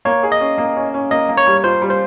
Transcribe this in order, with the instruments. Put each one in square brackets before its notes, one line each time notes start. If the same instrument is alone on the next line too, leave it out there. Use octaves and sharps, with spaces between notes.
[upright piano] A#3 [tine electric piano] C#5
[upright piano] G#4
[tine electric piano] D#5
[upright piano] C#4
A#3
C#4
C#4
[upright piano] A#3 [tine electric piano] D#5
[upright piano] A#3
[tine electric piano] C#5
[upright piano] G3
[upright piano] F4 [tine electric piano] C5
[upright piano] G3
[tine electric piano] C5